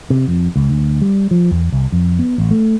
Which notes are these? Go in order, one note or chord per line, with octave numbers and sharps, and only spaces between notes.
C3
F2
C#2
D2
G3
F3
E2
C2
F2
B3
A1
A3